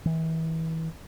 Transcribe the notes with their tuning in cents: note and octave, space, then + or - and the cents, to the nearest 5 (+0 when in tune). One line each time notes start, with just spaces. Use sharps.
E3 -30